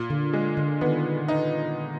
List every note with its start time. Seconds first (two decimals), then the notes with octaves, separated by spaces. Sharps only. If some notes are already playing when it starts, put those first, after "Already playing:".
Already playing: A#2
0.10 D3
0.33 G#3
0.57 D3
0.81 D#3 B3
1.28 D#4